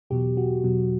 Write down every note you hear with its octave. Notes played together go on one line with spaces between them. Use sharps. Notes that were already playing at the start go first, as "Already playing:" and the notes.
E2 B2 F#3 G4
F#4
E2 B2 F#3